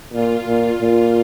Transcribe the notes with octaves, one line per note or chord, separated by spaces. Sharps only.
A#2 F4
A#2
A#2 F4